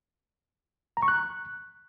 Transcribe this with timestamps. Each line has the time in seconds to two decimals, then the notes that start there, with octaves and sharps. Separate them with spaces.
0.97 A#5
1.02 C#6
1.08 F#6